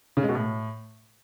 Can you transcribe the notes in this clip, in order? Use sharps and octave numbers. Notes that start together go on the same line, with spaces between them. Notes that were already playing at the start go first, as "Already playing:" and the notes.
C#3
G#3
B2
A2